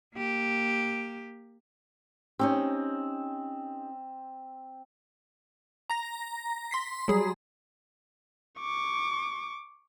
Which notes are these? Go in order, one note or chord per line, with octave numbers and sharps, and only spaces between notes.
A#3 G4
C4 C#4 D#4 G4
A#5 A#6
C6 B6 C7
F#3 G3 G#4
C#6 D6